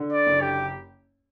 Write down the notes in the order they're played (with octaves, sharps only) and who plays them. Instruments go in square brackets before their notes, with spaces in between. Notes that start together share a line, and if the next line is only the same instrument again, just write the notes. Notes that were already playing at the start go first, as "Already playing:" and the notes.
Already playing: [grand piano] D3
[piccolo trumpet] D5
[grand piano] F#1
[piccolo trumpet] G4